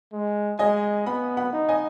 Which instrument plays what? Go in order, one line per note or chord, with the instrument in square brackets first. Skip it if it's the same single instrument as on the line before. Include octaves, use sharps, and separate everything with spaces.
[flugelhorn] G#3
[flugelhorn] G#3 [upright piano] D#5 G#5
[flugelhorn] B3 [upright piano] F#5 B5
[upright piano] F#5 B5
[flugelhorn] D#4
[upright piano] D#5 G#5